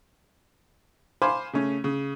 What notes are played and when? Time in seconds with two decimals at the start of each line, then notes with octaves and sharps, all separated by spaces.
1.22 C5 F5 G#5 B5 C6 D6
1.53 C#3 A3 C#4
1.84 C#3